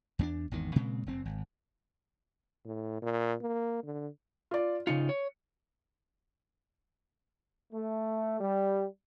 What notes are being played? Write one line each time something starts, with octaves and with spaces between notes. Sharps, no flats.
E2 A#3 D4
G#1 E2 D#3
A#2 C#3 G#3 C4
F1 C4
G#1
A2
A#2
A#3
D3
F4 D5
C#3 D#4 F4 C#7
C#5
A3
G3